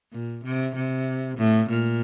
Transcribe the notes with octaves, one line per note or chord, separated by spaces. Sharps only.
A#2
C3
C3
A2
A#2